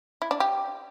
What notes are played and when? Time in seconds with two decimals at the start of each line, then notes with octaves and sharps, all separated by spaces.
0.22 E4
0.31 D4
0.40 G4